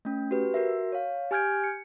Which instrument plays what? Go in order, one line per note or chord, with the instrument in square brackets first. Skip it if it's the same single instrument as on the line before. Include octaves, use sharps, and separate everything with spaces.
[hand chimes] A3 C#4
F#4 G4 B4
F#4 A#4 E5
C#5 F5
G4 G#5 F6 G6 G#6 D7
C#7